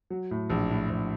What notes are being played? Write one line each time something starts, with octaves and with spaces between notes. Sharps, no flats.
F#3
A2
A#1
A2
A#1